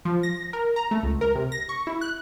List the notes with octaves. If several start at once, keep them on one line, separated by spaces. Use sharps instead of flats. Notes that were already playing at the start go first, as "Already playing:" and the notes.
F3
A#6
A#4
A#5
A3
C#2
A#4
C3
A#6
C#6
E4
F#6